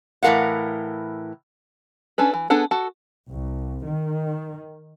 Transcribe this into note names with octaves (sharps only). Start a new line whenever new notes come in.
A2 E3 G4 A#4 F5 F#5
C#4 D4 A4 B4
E3
B3 D4 G#4 A4 F#5
F#4 A4
C2
D#3